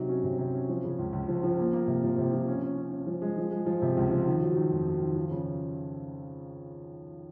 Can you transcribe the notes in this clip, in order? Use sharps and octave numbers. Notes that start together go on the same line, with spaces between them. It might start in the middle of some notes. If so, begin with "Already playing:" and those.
Already playing: C3 F#3 D#4
C#4
C3
C3
C#4
F3
C#3
C#2
C#2
F3
F3
A#3
A#3
C3
F3
C3
F3
C#4
C#4
C#4
C#4
F3
G#3
F3
G#3
F3
C3
C#2
F3
D#3
F#3
D#3
F2
F#3
D#3
F3
C#3